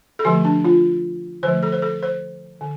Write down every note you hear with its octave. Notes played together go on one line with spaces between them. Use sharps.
A4
D3 F3 A3 G4
D4
F4
D3 F3 A3 C5
A4
C5
A4
C5
D3